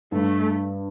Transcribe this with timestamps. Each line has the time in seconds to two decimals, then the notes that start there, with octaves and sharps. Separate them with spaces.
0.12 G2 A3